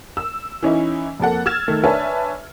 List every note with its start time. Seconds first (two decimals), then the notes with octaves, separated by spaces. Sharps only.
0.17 E6
0.63 E3 C#4 D#4 E4
1.20 F2 A#3 A4 F#5
1.46 E6 F6 G#6 A6 E7
1.68 D#3 A3
1.84 D4 B4 C#5 E5 G#5 A5